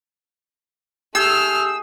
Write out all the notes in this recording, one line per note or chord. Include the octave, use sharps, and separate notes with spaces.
A3 G4 G#4 E6 F6 G6